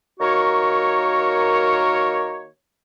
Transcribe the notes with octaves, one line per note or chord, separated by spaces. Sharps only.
D#3 A#3 F#4 A#4 C#5